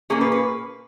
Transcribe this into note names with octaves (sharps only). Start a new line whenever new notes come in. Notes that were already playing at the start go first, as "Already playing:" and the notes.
A#2 A#3 C#4 G#4
B4
B4